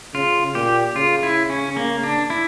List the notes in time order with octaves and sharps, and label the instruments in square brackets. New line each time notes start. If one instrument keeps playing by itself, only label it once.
[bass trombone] C#3 [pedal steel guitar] F4
[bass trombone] A#2 [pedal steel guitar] G4
[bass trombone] C#3 [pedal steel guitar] F4
[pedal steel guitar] E4
C#4
A#3
D4
E4